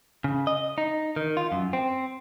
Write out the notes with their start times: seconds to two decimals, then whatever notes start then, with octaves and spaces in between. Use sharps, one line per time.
0.24 C#3
0.47 D#5
0.78 D#4
1.16 D#3
1.37 F4
1.52 F#2
1.73 C4